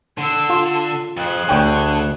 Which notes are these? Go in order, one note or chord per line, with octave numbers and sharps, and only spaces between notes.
D3 C6 E6
F4
F2 G#4 C5 F#6
D2 D3 C#5 G5